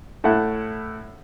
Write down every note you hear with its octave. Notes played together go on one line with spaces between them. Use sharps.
A2 A3 E4 F#5